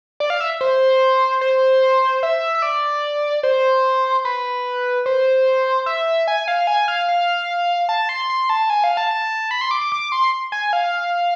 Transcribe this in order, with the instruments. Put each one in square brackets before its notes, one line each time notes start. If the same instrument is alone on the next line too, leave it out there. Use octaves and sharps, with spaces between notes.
[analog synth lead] D5
F5
E5
C5
C5
E5
E5
D5
C5
B4
C5
E5
G#5
F5
G#5
F5
F5
A5
C6
C6
A5
G#5
F5
A5
A5
B5
C6
D6
D6
D6
C6
G#5
F5